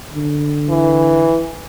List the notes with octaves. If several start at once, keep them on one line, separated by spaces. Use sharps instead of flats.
D3
E3